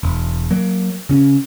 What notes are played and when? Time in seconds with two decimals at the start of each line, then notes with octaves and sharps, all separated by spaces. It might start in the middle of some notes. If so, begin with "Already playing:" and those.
0.03 E1
0.51 F#3 A#3
1.09 C#3 C#4